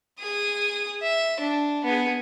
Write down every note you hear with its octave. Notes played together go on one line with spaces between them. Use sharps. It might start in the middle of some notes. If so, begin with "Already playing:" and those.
G#4 D#6
E5
D4
B3 G#4